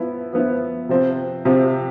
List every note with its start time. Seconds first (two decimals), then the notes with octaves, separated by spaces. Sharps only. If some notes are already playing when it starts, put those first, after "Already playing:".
Already playing: F3 B3 E4
0.33 F3 B3 E4
0.89 C3 F3 C4
1.45 C3 F3 C4